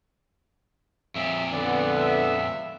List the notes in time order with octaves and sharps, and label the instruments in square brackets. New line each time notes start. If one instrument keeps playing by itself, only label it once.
[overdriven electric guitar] F2 A#2 [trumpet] E5
[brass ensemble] D3 B3 [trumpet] D5
[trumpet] E5